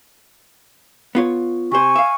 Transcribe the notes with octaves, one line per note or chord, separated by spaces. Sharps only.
B3 F4 C#5
C3 C5 G#5 C#6
E5 F5